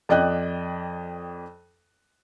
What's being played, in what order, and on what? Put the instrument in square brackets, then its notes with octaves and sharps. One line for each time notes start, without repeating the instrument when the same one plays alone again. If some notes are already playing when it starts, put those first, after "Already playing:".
[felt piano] F2 D5 D#5 G5 F#6